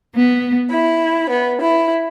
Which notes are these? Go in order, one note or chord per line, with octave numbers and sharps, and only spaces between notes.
B3
E4
B3
E4